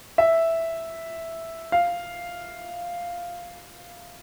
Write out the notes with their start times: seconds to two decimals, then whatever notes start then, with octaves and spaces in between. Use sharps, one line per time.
0.18 E5
1.72 F5